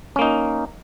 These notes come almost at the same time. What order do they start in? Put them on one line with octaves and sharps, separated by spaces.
C#4 A#3 D#4